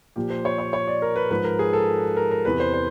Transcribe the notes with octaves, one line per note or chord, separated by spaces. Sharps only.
A#2 F3 G4
C5
C#5
C#5
C#5
D5
A#4
B4
G#2 F3 B4
A#4
G#4
A4
A#4
A#4
E2 C3 E3 B4
C5
C5